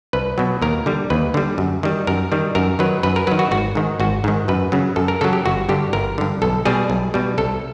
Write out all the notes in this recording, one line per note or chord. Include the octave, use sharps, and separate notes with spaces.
C2 B4
B2 F#3
D#2 A#4
D3 G3
D#2 B4
D3 G3
F#2
D#3 G3
F#2 A#4
D#3 G3
F#2 A#4
D#3 F#3 B4
F#2 B4
A#4
D#3 F#3 B4
F#4
G#1 F#4
G#2 D#3
G#1 F#4
G#2 D#3
F#2 B4
C#3 F#3
F#2 A4
A#4
C#3 F#3 A4
G4
G1 F#4
G2 D3 G4
G1 A#4
G2 D3
B1 A4
B2 G3 G#4
B1
B2 G3
C2 A4